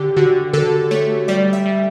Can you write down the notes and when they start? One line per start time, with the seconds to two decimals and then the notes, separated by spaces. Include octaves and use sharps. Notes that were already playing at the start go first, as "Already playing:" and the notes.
Already playing: D3 G4
0.16 D3 F#4
0.53 D3 A4
0.91 A3 C#5
1.28 G3 D5
1.53 E5
1.66 G3